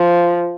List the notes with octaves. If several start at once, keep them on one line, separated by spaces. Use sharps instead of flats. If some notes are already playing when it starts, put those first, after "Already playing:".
Already playing: F3